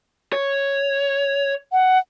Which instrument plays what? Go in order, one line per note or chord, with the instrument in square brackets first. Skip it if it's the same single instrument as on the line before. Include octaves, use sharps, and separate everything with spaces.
[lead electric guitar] C#5
[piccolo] F#5